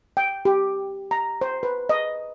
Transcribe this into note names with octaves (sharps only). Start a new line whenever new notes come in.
G5
G4
A#5
C5
B4
D#5